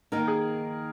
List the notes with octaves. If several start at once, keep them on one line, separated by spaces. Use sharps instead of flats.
D#3 A#3 D#4 A#4
G#4